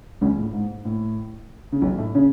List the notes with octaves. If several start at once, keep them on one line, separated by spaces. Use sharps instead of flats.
C#2 C#3
A2
G#2
A2
C#3
B1 B2
A2 A3
C#3 C#4